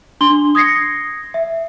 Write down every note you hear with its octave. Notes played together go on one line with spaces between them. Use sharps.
D4 C6 G7
D#6 G#6 A#6 C7 C#7
E5